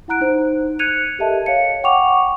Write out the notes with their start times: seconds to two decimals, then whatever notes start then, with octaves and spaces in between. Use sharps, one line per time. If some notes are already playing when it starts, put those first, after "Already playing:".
0.08 E4 F#5 A#5 F#6 D7
0.21 D#4 C5
0.79 F#6 G#6 C#7 D#7 F7
1.19 G4 A4 A#4 D#5 E5 A5
1.46 C#5 F5 C#7
1.84 F#5 G5 C#6 D6 F7